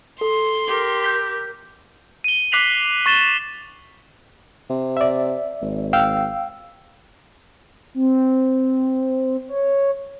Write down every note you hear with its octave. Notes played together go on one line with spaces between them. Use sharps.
A4 C6
G4 A#4
G6 B6
D#7 G7
D6 F#6 B6 C7 F7 F#7
C#6 A6 E7 G7
E7
C3
D5 E5
G#1
F5 G5 E6
C4
C#5